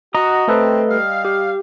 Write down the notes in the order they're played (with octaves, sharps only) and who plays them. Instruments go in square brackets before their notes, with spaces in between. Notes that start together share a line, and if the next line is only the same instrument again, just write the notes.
[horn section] F#4 [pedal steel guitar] D#5 A#5
[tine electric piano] A3 A4 B4 [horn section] C4
[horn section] G3 F5
[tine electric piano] G4